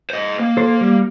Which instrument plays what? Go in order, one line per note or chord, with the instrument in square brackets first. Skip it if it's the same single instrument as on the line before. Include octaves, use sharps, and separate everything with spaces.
[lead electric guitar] C5 D#5
A#3
[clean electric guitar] A4 C5
G3